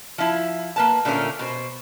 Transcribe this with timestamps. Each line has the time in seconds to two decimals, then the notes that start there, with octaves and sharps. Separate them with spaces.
0.18 F3 E4
0.76 A#3 B4 A5
1.05 A#2 D3 A3 C#4 A#4
1.39 B2 C5